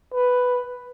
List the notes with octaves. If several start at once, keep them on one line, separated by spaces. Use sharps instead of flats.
B4